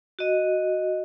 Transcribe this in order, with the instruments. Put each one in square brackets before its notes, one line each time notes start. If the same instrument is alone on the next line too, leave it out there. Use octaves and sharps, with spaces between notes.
[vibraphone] F#4 D#5